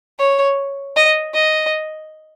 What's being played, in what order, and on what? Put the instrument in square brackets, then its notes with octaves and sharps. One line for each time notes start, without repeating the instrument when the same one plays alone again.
[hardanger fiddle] C#5
D#5
D#5